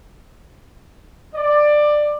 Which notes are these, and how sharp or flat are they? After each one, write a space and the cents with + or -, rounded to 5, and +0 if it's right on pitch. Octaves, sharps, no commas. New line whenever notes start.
D5 +15